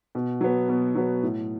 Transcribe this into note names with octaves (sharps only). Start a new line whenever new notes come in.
B2
F#3 B3
B2
F#3 B3
A2